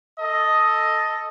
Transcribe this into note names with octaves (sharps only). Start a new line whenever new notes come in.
A4 D#5